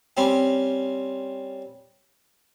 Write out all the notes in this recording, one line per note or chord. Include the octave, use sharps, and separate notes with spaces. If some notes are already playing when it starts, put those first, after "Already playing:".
G3 C4 C#4 G4